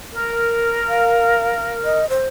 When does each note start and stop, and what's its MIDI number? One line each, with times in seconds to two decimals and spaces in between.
0.12 2.00 70
0.88 1.72 77
1.85 2.08 75
2.09 2.27 72